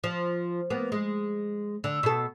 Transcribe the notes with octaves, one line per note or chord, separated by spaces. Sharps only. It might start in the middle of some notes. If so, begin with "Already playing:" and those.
F3
A#3 B3
G#3
D3
B2 A4